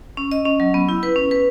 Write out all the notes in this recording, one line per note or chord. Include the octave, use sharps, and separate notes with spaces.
C#4
D#5
C#4
F#3
B3
E4
B4
C#4
B4